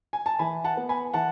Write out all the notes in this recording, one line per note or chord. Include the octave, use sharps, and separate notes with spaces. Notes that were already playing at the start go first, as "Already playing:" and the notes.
G#5
A5
E3 G#5 B5
F#5 A5
B3
G#5 B5
E3 F#5 A5